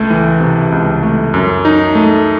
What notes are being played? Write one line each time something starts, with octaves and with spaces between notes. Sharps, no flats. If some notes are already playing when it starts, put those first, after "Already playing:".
Already playing: C#2 A3
E3
C3
C#2
A3
F#2
D#4
A3